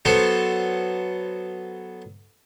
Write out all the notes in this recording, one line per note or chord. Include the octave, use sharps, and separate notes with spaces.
F#3 B3 A4 C5